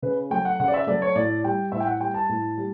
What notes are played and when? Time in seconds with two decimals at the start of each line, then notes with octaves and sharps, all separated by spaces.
0.02 C#3 B4
0.30 F#3 A3 G5
0.45 F#5
0.60 C#3 F#5
0.68 D5
0.74 E5
0.87 F#3 A3 D5
1.02 C#5
1.16 A2 D5
1.44 G3 G5
1.72 A2 E5
1.80 G5
1.87 F#5
2.01 G3 G5
2.14 A5
2.29 A2
2.57 G3